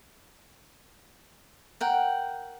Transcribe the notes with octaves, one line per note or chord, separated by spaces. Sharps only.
A#4 F#5 G5